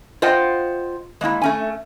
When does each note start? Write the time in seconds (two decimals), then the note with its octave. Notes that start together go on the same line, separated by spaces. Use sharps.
0.22 F4 C5 D#5 F#5 G5
1.21 G#3 A#3 C4 E4
1.42 A3 C#4 G#5